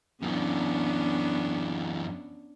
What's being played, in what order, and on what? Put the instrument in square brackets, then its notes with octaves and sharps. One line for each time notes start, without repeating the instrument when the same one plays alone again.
[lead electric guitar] F#2 E3 [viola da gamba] B3 C#4 D4